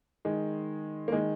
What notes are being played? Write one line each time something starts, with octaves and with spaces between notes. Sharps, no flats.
D#3 G#3
A#3
D#3 G#3